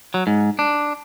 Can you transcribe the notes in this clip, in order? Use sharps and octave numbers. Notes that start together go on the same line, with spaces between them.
F#3
G#2
D4